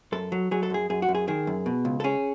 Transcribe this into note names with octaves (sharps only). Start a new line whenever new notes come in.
F#2 A4
F#3
F#3 G#4
A4
F#2 G#4
F#2 G#4
F#4
F#2
G#4
D#3 G#4
F#2
B2
C#2
A4
C#4 G#4